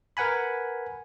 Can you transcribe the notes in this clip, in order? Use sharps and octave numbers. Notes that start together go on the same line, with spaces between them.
A#4 B4 F#5 G#5 B5